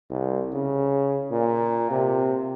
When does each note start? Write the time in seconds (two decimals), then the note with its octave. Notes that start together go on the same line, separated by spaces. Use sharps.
0.10 C2
0.53 C#3
1.31 A#2
1.91 C3